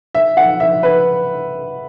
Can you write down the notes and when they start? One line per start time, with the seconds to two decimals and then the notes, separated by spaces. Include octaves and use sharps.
0.15 E5
0.37 F#5
0.60 E5
0.83 B4